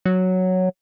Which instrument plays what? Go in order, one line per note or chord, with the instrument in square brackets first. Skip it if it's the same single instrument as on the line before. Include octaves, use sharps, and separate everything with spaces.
[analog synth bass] F#3